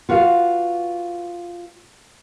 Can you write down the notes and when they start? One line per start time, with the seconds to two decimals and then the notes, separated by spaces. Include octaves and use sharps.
0.09 F4 F#4 B4 F5